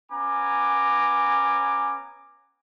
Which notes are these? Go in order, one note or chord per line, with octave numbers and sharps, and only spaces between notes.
B3 C#4 G#5 A#5 D6